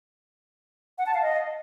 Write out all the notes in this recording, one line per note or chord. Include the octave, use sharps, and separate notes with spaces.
F#5
A5
F5
D#5